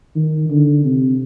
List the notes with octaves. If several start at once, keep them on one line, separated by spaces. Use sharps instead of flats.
D#3
D3
C3